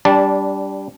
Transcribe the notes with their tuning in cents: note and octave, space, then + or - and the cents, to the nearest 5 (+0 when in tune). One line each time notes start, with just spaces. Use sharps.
G3 +0 D4 -20 A5 +0